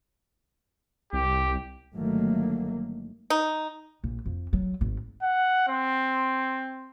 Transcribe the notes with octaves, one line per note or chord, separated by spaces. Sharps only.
C2 G4
G1 D#3 F#3 A3 A#3
D#4
A#1
F2
F#3
G#1
F#5
C4